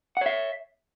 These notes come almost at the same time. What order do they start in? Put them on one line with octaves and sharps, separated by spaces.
F#5 C#5 E5